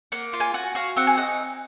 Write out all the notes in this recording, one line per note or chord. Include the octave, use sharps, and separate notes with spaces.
A#3 F#5
F4
G#5
F#4 F#5
F#4 F5
C4 F#5
G#5
D#4 F#5